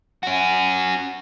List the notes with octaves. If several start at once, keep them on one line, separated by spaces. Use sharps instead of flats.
C#4 F#4